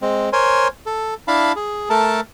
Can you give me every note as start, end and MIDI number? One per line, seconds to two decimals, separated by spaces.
0.02 0.29 56
0.02 0.29 60
0.33 0.68 70
0.33 0.68 72
0.33 0.68 73
0.33 0.68 80
0.33 0.68 84
0.86 1.14 69
1.28 1.52 62
1.28 1.52 64
1.28 1.52 77
1.28 1.52 81
1.28 1.52 83
1.56 1.89 68
1.90 2.20 57
1.90 2.20 69
1.90 2.20 70
1.90 2.20 81